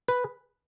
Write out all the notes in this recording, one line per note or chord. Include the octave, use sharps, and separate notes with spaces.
B4